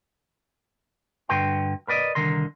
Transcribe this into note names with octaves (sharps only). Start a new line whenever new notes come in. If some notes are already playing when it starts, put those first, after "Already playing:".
G2 D3 F#4 B4 G5 C6
A#4 B4 D5 D#5
C2 A#2 D3 D#3 A#4 C6